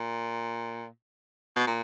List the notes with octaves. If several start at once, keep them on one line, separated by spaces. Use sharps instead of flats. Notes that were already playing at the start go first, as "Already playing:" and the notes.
Already playing: A#2
B2
A#2